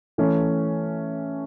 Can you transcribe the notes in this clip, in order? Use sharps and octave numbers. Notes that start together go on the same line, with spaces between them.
E3 A3 C#4